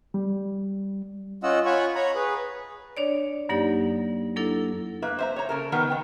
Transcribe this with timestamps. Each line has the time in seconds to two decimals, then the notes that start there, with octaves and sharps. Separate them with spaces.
0.14 G3
1.43 C#4 F4 D#5 F#5 E6
1.66 F4 C#5 F#5 G#5 B5 C#6
1.95 C#5 A#5 B5
2.15 G#4 B4
2.97 D4 C#5 D5
3.49 F#2 F#3 A#3 D#4 G4 D5
4.36 F#3 A#3 D4 E4 A4
5.02 A#3 B4 E5
5.19 C5 E5 A#5
5.36 C#5 A#5
5.49 C#3 A4 A#4
5.72 D#3 F#3 B3 A#4 B4
5.90 D#3 G5